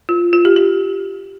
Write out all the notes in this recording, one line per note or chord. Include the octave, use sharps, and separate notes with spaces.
F4
F4
G4
G4